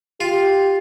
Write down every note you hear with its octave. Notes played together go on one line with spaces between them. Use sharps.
F4 G4